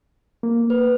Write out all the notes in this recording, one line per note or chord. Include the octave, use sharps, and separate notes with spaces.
A#3
B4